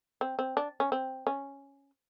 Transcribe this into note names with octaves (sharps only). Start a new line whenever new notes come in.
C4
C4
D4
C#4
C4
C#4